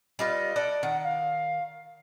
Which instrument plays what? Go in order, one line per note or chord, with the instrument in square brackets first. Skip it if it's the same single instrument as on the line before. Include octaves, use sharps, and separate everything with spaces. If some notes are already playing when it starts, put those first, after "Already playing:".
[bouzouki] G3 F4 B4 [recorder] D#5
[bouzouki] A4 D5 F#5
[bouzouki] D#3 [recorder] F#5
[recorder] F5